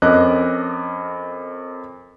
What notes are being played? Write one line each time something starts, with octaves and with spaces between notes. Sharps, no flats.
F2 C#4 A#4 D#5 D6 F#6